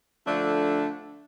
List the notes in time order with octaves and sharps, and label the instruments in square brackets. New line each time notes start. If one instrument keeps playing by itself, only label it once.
[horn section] D3 F3 A3 D4